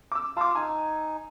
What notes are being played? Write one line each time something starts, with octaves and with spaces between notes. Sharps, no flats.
D6 E6
F4 F5 A5 D6
D#4 G#5